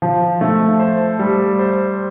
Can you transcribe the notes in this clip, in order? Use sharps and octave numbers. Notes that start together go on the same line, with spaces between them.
F3
A3
C5
G3
C5